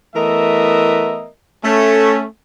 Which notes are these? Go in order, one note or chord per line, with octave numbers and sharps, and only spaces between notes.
E3 A3 B3 A#4 D#5 E5
A3 C#4